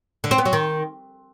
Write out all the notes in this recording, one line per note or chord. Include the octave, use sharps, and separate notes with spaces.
D3
C4
B3
F#3
D#3